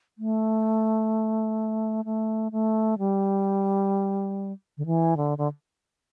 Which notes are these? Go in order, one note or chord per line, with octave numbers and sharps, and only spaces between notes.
A3
A3
A3
G3
D3
E3
D3
D3